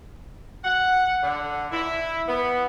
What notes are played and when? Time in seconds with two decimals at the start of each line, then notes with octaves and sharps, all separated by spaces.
0.64 F#5
1.22 D3
1.72 E4
2.28 B3